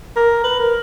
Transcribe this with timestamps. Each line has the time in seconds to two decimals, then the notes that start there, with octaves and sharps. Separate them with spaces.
0.16 A#4
0.44 B4
0.60 A#4